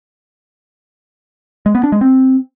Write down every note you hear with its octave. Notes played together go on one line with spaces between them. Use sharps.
G#3
B3
D4
G#3
C4